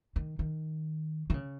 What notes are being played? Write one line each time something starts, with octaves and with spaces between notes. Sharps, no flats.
D#3
D#3
D#3
C#3